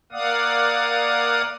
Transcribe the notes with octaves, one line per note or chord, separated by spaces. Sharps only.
A#3 D5 F5 F#5 D#6